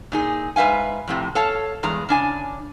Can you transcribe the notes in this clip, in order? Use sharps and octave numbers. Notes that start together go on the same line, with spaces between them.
A#2 D#4 G#4
G#2 B4 E5 F5 G#5
F2 A2 C3
A4 C#5 F5 A5
E2 G2 G#3 A#5
C#3 D4 G#5